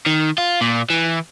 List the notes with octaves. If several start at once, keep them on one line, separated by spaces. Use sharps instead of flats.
D#3
F4
A#2
E3